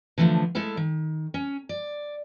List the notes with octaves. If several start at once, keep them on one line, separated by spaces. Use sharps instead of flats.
D3 E3 F3 G#3 A3
G#3 A3 E4 A4 F5
D#3
C#4
D5